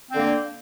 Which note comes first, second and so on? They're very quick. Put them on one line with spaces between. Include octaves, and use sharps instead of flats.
C4 D3 A#3